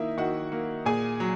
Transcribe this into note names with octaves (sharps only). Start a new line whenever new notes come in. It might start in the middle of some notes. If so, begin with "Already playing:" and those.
Already playing: D#3 A#3 D#4 E4 D#5 E5
D#3 F#4 F#5
A#3
A#2 G#4 G#5
F#3